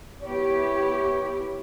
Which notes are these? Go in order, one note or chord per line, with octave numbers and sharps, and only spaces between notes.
B3 E4 G4 C#5